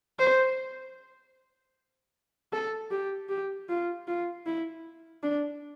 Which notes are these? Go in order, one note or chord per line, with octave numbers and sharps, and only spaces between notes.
C5
A4
G4
G4
F4
F4
E4
D4